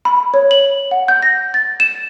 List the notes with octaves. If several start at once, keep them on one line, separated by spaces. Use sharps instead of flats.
B5
C#5
F#7
F#5
G6
A#6
A6
E7